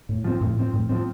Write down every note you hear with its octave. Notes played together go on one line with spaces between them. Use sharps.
A2
F3 C4
A2
F3 C4
A2
F3 C4